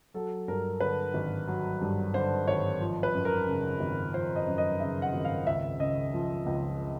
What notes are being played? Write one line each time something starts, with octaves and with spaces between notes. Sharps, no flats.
F#3 A4
G2 A#4
D3 B4
G#1
F#3
G2
D3 C5
G#1 C#5
F3
B4
F#2
A#4
C#3
G#1
F3 C5
D#5
F#2
D#5
C#3 E5
F#5
G#1
F5
C#2 E5
C#3 D#5
F3
C#2